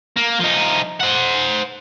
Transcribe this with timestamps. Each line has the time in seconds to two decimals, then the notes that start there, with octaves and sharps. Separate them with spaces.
0.17 A#3
0.40 F3 D#4
1.00 C5 F#5